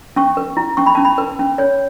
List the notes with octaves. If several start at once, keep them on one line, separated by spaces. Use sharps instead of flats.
C#4 C#6
B4
E4
C#4 C#6
B5
C#4 A5
B5
B4
C#4
C#5